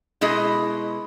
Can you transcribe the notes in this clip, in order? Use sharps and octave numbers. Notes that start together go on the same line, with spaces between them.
B2 G#3 E4 G#4 D#5